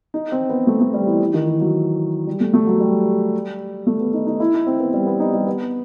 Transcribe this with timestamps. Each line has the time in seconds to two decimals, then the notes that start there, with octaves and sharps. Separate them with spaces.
0.14 D#4
0.32 C4
0.50 B3
0.67 A3
0.81 A3
0.94 G3
1.07 E3
1.20 E3
1.34 D#3
1.47 E3
1.61 F#3
2.27 G3
2.40 A3
2.54 A3
2.67 F#3
2.80 G3
3.87 A3
4.00 B3
4.14 D#4
4.27 D#4
4.40 E4
4.53 D#4
4.67 C4
4.80 B3
4.93 G3
5.07 B3
5.20 D#4
5.33 G3
5.47 B3